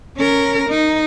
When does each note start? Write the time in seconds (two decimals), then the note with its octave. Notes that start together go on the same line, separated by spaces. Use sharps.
0.17 C#4 A#4
0.69 D#4